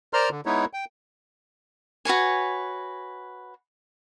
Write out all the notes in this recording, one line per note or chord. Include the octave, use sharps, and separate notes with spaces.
A#4 C5 D5 A#5 C6 F6
D3
G#3 B3 D#4 E4 C#5
G5
F#4 B4 C#5 G#5